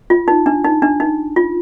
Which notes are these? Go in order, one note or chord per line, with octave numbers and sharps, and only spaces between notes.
F4
D#4
D4
D#4
D4
D#4
F4